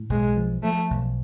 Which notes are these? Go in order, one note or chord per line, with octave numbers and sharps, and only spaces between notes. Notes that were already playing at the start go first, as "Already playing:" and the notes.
Already playing: A2
B1 G#3
F3
F3 A3
B1